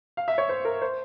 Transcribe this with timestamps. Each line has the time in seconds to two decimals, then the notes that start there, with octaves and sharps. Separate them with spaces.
0.17 F5
0.28 E5
0.38 C#5
0.49 C5
0.65 A#4
0.82 C5